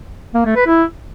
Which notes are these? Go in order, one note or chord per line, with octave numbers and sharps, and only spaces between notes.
A#3
A3
B4
E4